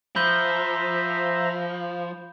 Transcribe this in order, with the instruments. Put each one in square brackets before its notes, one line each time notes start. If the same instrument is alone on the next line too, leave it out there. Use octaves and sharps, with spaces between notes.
[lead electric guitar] F3 [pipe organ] C5 E5 A#5 [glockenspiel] B5 G6 G7